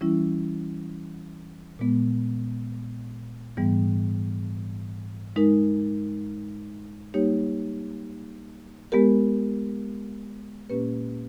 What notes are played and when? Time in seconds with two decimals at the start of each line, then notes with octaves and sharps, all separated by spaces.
0.01 E3 G3 C#4 E4
1.79 A#2 G#3 B3
3.57 G#2 E3 G3 B3
5.36 G#3 D#4 A#4
7.14 G3 A#3 D#4 G4 C#5
8.92 G#3 B3 G4 A#4
10.70 A#2 A#3 C#4 G4 B4